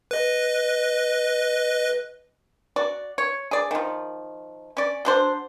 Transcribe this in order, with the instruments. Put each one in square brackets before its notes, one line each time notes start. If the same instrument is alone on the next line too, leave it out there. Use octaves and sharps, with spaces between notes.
[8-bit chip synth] B4 D#5
[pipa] F#4 D5
C#5
G#4 D5
D#3 F3
C#4 D5
F#3 D4 C5